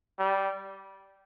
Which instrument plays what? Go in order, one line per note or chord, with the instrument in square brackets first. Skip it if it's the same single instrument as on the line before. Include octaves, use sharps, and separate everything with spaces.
[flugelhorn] G3